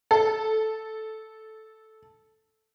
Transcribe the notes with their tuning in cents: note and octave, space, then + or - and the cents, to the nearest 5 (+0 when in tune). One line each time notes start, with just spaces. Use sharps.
A4 -5